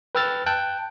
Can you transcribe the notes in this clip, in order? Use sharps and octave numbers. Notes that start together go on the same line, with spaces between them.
B4 G5 E6 F6 A6
G5 A5 F#6